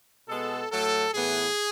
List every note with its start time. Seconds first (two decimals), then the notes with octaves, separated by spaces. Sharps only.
0.29 B2 G#3 B3 A4
0.71 A2 F#3 A3 A4
1.14 A2 E3 B3 G#4